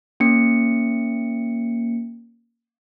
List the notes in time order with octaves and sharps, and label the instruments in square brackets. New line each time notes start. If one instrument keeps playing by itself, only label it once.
[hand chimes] A#3 C#4 C#7